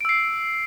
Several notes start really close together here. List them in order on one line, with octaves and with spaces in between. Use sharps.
D7 E6 C7